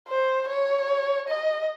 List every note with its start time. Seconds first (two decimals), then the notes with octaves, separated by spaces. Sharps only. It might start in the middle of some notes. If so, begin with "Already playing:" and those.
0.08 C5
0.48 C#5
1.29 D#5